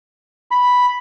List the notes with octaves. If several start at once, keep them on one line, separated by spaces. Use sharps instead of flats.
B5